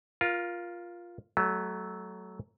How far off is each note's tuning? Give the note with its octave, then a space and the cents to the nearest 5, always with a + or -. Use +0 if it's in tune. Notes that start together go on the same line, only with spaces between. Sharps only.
F4 +0 A#4 +25
F#3 +15 A3 -15